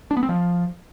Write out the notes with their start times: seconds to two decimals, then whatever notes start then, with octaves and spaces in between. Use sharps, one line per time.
0.11 D4
0.17 B3
0.23 C4
0.29 F3